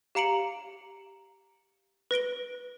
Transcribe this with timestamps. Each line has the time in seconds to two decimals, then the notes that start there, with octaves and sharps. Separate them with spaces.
0.15 G4 F5 A#5 C#7 D7 F#7
2.11 B4 A#6 D7 G7